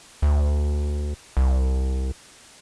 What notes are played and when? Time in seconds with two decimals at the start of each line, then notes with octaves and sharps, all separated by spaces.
0.22 D2
1.37 C2